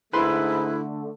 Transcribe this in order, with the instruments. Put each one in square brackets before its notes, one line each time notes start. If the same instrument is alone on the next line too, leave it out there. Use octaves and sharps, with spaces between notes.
[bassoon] G#2 [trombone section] D3 A3 [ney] E4 [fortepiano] B4 C6